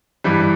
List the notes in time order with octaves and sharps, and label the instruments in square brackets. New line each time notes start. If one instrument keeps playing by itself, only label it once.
[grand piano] G2 E3 G3